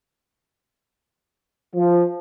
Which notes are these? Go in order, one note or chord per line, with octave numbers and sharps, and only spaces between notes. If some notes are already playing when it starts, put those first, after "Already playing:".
F3